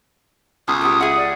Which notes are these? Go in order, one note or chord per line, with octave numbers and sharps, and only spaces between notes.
C#2 B2 D#6
A3 B3 G4
G#4 E5 F#5
D5